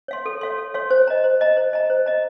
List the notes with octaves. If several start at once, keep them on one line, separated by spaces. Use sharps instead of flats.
C#5 F5 C6
A4
C#5 F5 C6
A4
C#5 F5 C6
C5
D#5 A#5
C5
D#5 A#5
C5
D#5 A#5
C5
D#5 A#5